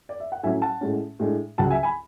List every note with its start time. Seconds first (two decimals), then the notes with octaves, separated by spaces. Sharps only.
0.09 D5
0.20 E5
0.32 F#5
0.43 A2 F#3 C#4 E5 G#5
0.62 F#5 A5
0.81 A2 G#3 C#4
1.19 A2 G#3 D4
1.58 C#2 C#3 F#3 F#5 A5
1.70 E5 G#5
1.83 G#5 B5